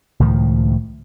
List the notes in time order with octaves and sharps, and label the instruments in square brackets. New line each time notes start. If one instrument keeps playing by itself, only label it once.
[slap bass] C#2 A2 D#3 F3